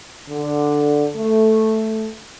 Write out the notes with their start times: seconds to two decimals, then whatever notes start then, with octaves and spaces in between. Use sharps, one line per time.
0.29 D3
1.16 A3